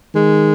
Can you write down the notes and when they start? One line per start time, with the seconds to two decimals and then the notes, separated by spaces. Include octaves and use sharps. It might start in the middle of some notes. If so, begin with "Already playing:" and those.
0.15 D#3 G#3